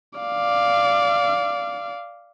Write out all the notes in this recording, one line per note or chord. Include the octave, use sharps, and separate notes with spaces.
D5 F5